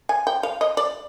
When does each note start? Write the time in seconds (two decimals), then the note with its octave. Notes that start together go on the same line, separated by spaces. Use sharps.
0.09 G#5
0.27 G5
0.43 F5
0.61 D#5
0.77 D5